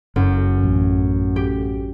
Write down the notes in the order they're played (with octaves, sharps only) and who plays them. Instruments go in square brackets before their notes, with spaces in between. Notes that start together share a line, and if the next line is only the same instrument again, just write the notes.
[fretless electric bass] F#1 [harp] F#2
[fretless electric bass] A1
[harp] G4